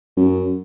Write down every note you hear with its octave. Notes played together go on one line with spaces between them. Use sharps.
F#2